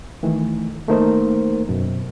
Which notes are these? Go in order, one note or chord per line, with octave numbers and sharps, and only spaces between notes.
D#3 E3 A3
D#3 A3 A#3 D#4 A#4 C5
F#2 B2